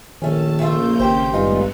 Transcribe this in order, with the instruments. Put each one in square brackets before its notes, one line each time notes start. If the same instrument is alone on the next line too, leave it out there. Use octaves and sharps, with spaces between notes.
[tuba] A#1 [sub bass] D#3 [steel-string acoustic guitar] A3 C#4 [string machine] A5
[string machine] C#3 A#3 G6 [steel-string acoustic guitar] A3 F4 E5
[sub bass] G#1 [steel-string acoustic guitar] G4 C5
[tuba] G2 [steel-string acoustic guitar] A#2 D#4 F4 [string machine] G#3 A3 B3